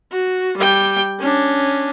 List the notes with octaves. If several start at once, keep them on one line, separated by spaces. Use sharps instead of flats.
F#4
G3 G5
C#4 D4